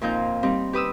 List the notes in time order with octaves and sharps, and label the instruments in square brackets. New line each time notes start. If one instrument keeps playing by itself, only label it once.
[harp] F2 A#2 F3 D#4 G6
G3 C4 D#4
G4 B4 D#6 E6